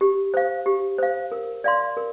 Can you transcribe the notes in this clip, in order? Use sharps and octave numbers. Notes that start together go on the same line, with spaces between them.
G4
C5 F5
G4
C5 F5
A#4
D5 F5 C6
A#4